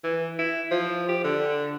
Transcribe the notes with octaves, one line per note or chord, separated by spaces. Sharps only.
E3
E4
F3
G4
D3